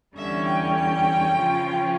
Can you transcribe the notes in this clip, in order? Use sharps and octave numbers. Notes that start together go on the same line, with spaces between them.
E2 D3 G3 C#4 E5
G5
G5
C#3 F3 C#4 F4